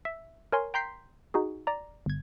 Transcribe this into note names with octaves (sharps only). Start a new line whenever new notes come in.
E5
A#4 C#5 G#5 C6
G5 A#5 C6 G6 B6 C7
D#4 F#4 G#4
D5 A#5
G1 G#6